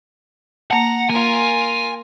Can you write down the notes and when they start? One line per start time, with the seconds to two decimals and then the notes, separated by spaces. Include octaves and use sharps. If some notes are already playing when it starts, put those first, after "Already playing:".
0.71 A#3 F#5 A5 A#5
1.10 A#3 F4 A#4 G#5